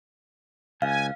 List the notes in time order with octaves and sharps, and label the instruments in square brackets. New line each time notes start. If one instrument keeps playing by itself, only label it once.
[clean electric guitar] C#2 [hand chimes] F5 [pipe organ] G#5